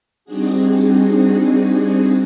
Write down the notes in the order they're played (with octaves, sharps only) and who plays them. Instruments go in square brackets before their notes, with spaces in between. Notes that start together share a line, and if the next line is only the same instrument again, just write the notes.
[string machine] G3 C4 D4 D#4 F#4 G#4